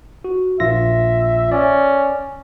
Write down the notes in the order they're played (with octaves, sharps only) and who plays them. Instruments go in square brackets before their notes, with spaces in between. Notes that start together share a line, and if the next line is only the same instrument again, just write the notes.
[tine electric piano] F#4
[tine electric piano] A#1 F4 A#6 [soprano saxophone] E5
[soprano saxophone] C#4 [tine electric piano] D5